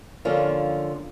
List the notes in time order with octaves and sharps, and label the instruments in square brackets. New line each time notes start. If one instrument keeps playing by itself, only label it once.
[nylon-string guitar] D3 F3 A#3 C#4 F4